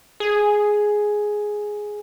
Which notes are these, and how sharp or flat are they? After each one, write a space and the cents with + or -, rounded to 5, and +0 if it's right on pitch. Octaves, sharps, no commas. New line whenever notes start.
G#4 +5